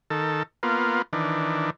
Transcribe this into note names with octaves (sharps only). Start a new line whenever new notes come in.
D#3 A4
A#3 B3 F4
D#3 E3 D4